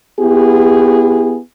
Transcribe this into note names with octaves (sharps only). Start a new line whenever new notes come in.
B3 E4 G4 G#4